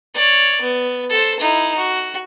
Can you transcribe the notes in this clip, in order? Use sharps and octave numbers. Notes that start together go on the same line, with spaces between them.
C#5 D5
B3
A4 C5
D#4 E4
F#4